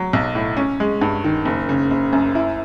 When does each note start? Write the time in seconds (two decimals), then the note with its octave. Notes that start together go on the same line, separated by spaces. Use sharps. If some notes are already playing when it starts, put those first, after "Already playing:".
Already playing: F#3
0.13 B1
0.35 A2
0.57 C#4
0.80 G#3
1.01 G2
1.24 D#3
1.45 F#1
1.69 C#3
1.91 F#1
2.13 F#2
2.35 E4